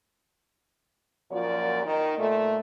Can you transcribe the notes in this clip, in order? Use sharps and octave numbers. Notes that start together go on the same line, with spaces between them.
F#2 A#2 F3 A#3 F#4 D5
D#3 D#4
A#2 A3